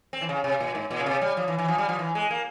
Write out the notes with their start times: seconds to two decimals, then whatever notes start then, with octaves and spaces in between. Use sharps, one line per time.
0.13 C4
0.21 E3
0.29 C#3
0.44 C3
0.60 A#2
0.75 G#2
0.91 A#2
0.99 C#3
1.06 C3
1.22 G3
1.37 F3
1.48 E3
1.59 E3
1.68 F3
1.78 G3
1.89 F3
1.99 E3
2.15 G#3
2.31 A#3